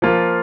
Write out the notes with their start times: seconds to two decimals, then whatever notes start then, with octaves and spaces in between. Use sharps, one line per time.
0.02 F3 A#3 F4